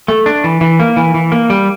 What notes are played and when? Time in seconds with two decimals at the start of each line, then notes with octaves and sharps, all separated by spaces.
0.08 A3
0.26 D4
0.44 E3
0.61 E3
0.80 A#3
0.97 E3
1.14 E3
1.32 A#3
1.50 G3